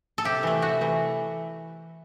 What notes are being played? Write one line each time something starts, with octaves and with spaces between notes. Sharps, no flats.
A4
C3 G4
E3 A3
C3 F#4
E3 A3